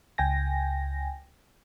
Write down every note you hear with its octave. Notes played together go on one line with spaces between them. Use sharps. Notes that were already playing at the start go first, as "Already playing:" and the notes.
C#2 G5 G#5 A#6